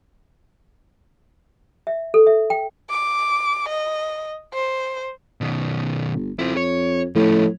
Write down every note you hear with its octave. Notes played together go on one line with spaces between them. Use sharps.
E5
A4
E5
G5
D6
D#5
C5
B2 D#3
G1
F2 E4 C5
C#5
A2 F3 C#4